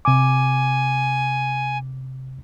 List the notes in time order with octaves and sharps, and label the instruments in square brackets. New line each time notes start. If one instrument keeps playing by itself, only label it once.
[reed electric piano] C3 D6 [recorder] G#5